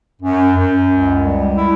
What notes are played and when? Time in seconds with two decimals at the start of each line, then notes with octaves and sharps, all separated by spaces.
0.22 F#2
0.56 F#2
0.89 C#2
1.23 G3
1.56 E4